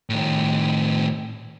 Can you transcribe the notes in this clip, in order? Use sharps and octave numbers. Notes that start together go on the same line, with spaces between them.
A2 D#3